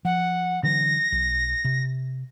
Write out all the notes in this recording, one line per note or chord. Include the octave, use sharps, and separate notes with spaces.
F3 F#5
D3 E3 F#3 A#6
B1
C3